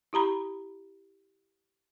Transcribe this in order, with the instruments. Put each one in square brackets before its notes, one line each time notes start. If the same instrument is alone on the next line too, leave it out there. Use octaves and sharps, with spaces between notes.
[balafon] E4 G4 A#5 B5